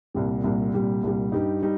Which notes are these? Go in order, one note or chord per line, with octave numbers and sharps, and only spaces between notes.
C2 A#2 G3
C2 A#2 G3
C2 A#2 G3
C2 A#2 G3
G2 G3 D#4 G4
G3 D#4